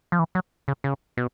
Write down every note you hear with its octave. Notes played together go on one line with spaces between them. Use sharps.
F3
E3
F#3
C#3
C#3
B2